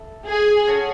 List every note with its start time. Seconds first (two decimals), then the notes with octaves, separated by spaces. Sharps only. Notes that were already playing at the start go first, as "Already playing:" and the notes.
Already playing: E4 A4
0.27 G#4
0.67 C#4 F#4 A4 C#5